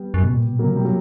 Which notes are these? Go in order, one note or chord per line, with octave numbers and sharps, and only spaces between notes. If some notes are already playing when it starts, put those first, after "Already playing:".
Already playing: G3 B3
F#2
B2
A#2
B2
A#2
C#3 F#3 A#3
B2 G3
F#3 A#3